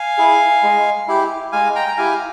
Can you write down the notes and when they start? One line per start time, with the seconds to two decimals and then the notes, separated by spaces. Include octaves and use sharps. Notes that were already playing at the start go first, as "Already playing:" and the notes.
Already playing: F5 G#5
0.18 E4 G#4
0.63 G#3
1.08 E4 G4
1.52 G#3 F5 G#5
1.75 G5 A#5
1.88 A#5
1.97 E4 G4 F5 G#5